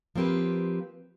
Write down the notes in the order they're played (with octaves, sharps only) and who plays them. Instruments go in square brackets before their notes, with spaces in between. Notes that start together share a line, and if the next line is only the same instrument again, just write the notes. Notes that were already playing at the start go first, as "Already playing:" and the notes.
[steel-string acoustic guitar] F3 A#3 C4 G4 B4